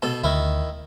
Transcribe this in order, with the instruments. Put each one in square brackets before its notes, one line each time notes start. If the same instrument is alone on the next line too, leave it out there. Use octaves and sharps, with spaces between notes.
[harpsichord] B2 A4
[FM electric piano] D2 [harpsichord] D#3 E4